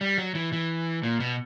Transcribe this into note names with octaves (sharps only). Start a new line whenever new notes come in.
G3
F#3
E3
E3
A#2
B2